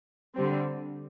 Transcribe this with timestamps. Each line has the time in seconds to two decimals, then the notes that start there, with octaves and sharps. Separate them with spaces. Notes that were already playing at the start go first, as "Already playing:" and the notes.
0.35 D3 G3 C4